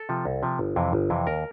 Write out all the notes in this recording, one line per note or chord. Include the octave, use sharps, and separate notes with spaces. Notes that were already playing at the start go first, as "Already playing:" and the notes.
Already playing: A4
C3 F3
C2
C3 F3
G1
F2 C3 E3
G1
F2 C3 E3
D#2 A#4